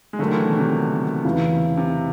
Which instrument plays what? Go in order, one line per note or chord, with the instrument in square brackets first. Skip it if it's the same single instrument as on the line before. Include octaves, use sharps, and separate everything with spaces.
[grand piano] G#3
[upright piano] D3 F#3 A#3 D4 [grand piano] A3
[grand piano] D#3
E3
B2
C3
[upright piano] E2 C#3 E3
[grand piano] C3